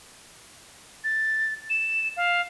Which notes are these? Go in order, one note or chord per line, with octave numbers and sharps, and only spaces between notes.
A6
E7
F5